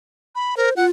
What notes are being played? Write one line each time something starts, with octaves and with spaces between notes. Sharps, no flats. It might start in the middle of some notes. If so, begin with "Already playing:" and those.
B5
A#4 C5
F4 F#5